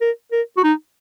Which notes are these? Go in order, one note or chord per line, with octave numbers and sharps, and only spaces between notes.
A#4
A#4
F#4
D#4